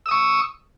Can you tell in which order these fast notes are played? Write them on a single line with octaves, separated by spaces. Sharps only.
E6 D#6 C#6